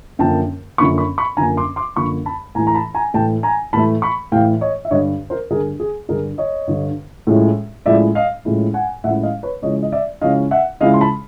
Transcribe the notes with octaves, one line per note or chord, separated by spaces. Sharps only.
F#2 D3 F3 A#3 G5 A5
F#2 D3 F3 A#3 B5 C#6
B5 C#6
B5 C#6
F#2 D3 F3 A#3 G#5 A#5
C6 D6
C6 D6
F#2 D3 F3 A#3 B5 C#6
A5 B5
A2 E3 A3 G#5 A#5
A#5
A5 B5
G#5 A#5
A2 E3 A3 G5 A5
G#5 A#5
A2 E3 A3 A5 B5
B5 C#6
A2 E3 A3 F5 G5
C#5 D#5
E5
G2 D3 G3 C#5 D#5
A#4 C5
G2 D3 G3 G#4 A#4
G#4
G2 D3 G3 G#4 A#4
C#5 D#5
G2 D3 G3
A2 F3 G#3 C#4 E4
A2 F3 G#3 C#4 E4 D5 E5
D#5 F5
A2 F3 G#3 C#4 E4
F#5 G#5
A2 F3 G#3 C#4 E4 E5 F#5
D#5 F5
B4 C#5
C#3 F3 G#3 C#4 E4 C#5 D#5
D#5
D5 E5
C#3 F3 G#3 C#4 E4 D#5 F5
E5 F#5
C#3 F3 G#3 C#4 E4 D#5 F5
C6
A5 B5